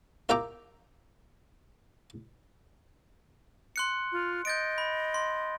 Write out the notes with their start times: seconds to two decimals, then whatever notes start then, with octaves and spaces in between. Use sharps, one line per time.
0.29 F4 A#4 E5 G5 A#5 D6
3.76 C6 F#6 C#7
4.12 F4
4.45 D#5 G6 A6 D7
4.78 B5
5.14 C6